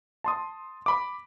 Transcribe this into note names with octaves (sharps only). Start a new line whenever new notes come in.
A5 C6 D#6
B5 D6